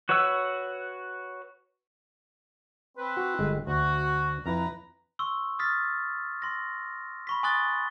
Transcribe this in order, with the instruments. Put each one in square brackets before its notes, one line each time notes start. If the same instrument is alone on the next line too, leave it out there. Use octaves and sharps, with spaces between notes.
[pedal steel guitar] F#4 B4 C#5 F#5 E6
[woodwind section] C4 B4
[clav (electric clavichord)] F#4
G1 G#3 G5
[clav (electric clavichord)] D2 [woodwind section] F#4
[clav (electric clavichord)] F2 E4 [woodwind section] B4 A#5
[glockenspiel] C6 C#6 E6
D#6 F6 A6 B6
C6 A#6
B5 C#6 B6
G#5 C6 D#6 F#6 A6 G7